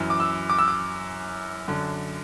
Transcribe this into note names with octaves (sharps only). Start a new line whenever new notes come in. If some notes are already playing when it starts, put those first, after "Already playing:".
Already playing: F#2 E3
D6
E6
D6
E6
D6
F#2 D3